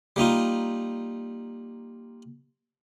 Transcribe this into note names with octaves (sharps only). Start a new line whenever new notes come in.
G3 A#3 D#4 F4